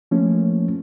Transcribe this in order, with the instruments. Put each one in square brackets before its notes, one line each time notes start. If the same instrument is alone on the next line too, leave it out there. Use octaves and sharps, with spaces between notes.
[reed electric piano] F3 A3 A#3 C#4